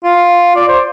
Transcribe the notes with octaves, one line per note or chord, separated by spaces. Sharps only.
F4
D5
C5